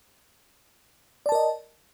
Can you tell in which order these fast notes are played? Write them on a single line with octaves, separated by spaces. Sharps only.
D5 A5 A#4 D#5